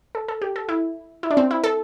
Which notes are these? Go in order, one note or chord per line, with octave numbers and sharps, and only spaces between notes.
A4
A4
G4
A4
E4
E4
D4
C4
E4
A4